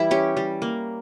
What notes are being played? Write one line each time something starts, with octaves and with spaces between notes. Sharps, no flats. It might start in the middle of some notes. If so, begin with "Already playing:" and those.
Already playing: E3 G3 E4
C#4 G4
G3
A#3